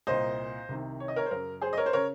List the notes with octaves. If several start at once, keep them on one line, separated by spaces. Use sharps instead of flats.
C2 A#2 C5 D#5
C2 C3 D#3
C#5
D#5
A#4 C#5
C5
F#2 C#3 A#4
G#4 C5
D#5
A#4 C#5
C5
C#3 A#4 C#5